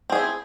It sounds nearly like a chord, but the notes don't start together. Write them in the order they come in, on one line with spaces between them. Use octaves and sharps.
C4 G#4 E4